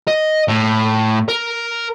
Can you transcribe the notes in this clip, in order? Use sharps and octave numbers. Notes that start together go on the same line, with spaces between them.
D#5
A2
A#4